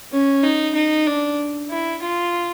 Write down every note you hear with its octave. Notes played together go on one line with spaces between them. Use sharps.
C#4
D#4
D#4
D4
E4
F4